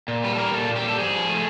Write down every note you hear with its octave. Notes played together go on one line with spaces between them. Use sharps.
A#2
G3 B4
A4
A#3 A#4
A#2 A4
A#2
G4
G3 A4
G#2 G#4
F3
A3